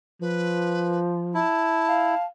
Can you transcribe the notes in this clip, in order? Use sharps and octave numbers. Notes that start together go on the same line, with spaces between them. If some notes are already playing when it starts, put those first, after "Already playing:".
F3 B4
E4 A5
F5